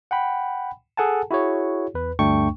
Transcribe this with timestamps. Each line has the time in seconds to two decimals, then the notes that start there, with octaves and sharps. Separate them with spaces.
0.11 F#5 G5 B5
0.97 G#4 A4 F#5 G#5 A5
1.31 E4 F#4 G#4 C#5
1.94 E2 B4
2.19 D2 G2 A3 D4 G5 C#6